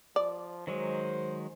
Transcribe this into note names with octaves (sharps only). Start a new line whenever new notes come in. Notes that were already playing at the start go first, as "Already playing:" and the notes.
F3 D5
D#3 F#3 G#3 C5